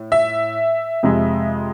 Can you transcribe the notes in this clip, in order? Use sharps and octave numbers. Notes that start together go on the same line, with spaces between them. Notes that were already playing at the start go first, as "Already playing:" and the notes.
Already playing: A2
E5
F2 C3 G#3